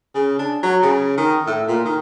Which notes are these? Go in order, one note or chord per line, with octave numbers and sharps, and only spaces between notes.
C#3
D4
F#3
C#3
D#3
A2
A#2
D#3